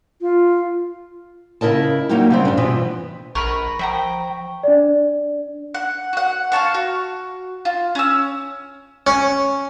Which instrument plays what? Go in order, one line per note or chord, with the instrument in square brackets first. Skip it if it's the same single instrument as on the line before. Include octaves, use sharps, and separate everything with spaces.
[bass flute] F4
[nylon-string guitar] C#3 E4 A#4 D#5 A5
F#3 G3 A#3 D#4 E4 G4
C#3 G3 C4
G2 D4
B2 E3 F3 C4
[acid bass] A#1 [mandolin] A#4 B4 B5 [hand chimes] C#6
[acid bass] F3 [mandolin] E5 G5 A#5
[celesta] D4 D5
[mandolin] F#5
F#4 F#5
F5 G#5 A5 C#6
F#4
F4
C#4 E6
[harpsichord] C#4